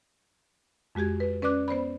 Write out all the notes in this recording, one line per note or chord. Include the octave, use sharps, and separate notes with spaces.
F2 G#3 F#4 G4 G#6
B4
C#4 B4 D5 D6 F#6
B3 C5 D5 B5